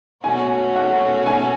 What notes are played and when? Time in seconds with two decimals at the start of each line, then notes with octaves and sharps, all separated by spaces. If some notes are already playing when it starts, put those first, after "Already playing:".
0.24 B2 A3 C#4 F#4 G#5
0.76 F#5
1.26 G#5